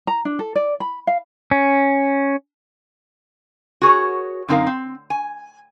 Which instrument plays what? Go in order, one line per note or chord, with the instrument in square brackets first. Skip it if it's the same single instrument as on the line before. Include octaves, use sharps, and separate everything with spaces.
[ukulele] A#5
D4
A4
D5
B5
F5
[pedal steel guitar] C#4
[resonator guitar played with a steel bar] F#4 G#4 A#4 C#5
F#2 D3 C4 D#4 A#4 F5
C4
G#5